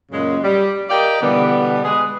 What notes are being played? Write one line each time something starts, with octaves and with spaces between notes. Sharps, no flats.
F#2 A#2 C#3 G#3
G3
G4 A#4 D5 D#5 F5 G5
B2 D3 E3 G3 B3
G#3 G#4 B4